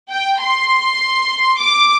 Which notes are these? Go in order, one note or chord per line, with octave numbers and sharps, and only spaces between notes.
G5
C6
D6